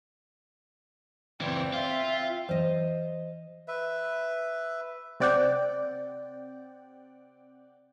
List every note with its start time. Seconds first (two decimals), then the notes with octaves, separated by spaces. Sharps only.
1.41 C#2 E3 C4 D5 G5
1.73 F4 E5
2.49 E3 C5 D#5
3.68 B4 E5
5.20 C3 C4 D5 F#5 G5